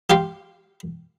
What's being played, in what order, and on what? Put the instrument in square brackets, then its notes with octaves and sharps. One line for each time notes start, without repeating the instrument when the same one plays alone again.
[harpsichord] G4 F5 G5 C6